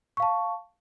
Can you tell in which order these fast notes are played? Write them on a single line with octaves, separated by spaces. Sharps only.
C#6 F5 A5